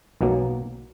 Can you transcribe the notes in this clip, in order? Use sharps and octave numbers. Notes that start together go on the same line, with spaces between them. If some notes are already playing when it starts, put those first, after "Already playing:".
B1 B2 F#3 A#3